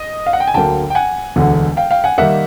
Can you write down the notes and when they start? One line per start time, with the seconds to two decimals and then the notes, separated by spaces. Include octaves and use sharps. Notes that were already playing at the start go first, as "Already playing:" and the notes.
Already playing: D#5
0.26 F5
0.33 F#5
0.40 G5
0.47 G#5
0.54 D2 D3 F#3 A#3 G5 A5
0.90 G5
0.95 F#5 G#5
1.36 E1 D2 D3
1.77 F5 G5
1.91 F5 G5
2.04 F#5 G#5
2.18 D#3 G3 A#3 E5 F#5